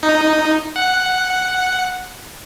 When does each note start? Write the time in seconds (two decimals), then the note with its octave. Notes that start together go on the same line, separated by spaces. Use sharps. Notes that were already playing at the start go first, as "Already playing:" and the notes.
0.03 D#4
0.76 F#5